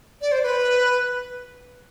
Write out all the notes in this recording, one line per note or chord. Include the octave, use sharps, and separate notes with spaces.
D5
C5
B4